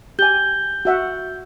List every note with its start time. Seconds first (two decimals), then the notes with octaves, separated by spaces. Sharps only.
0.19 G4 G#5 G6 G7
0.85 F#4 E5 F#5